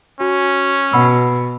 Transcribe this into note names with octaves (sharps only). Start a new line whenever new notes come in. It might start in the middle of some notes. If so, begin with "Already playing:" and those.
C#4 F#4
B2 F#5 B5 E6